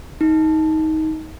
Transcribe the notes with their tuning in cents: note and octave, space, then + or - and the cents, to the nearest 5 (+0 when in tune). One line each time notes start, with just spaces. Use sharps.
D#4 +20